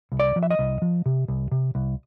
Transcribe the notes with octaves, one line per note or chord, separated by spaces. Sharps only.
C2
D5
F3
E5
D#5
C2
F3
C3
C2
C3
C2